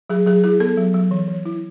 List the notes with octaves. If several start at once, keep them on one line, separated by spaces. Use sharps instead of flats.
F#3 G#4
F#3 G#4
E4 G#4
B3 A4
F#3
F#3
E3
E3
E4